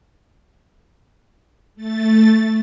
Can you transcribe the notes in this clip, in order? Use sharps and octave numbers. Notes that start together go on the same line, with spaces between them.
A3 A6